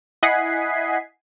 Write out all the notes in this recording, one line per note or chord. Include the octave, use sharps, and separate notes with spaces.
E4 D#5 F#5 G#5 B6 C7